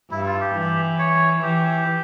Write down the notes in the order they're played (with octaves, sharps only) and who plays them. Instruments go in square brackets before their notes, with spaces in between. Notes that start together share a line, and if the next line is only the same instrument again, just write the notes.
[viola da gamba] G2 [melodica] E4
[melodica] F4
G4
[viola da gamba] E3
[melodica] C#5
[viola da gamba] E3 [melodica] G4